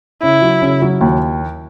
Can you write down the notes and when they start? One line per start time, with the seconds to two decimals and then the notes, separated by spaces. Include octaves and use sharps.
0.22 C#3 E4
0.42 F#3
0.62 C#3
0.82 F#3
1.01 D#2